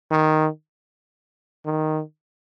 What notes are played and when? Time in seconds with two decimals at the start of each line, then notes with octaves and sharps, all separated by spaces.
0.11 D#3
1.66 D#3